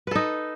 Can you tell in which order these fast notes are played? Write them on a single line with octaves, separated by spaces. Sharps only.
B4 A4 D#4